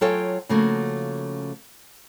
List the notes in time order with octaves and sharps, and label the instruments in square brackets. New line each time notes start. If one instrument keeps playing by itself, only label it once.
[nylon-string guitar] F#3 F4 A4 C#5 G5 G#5
C#3 F3 A3 A#3 C#4 F#4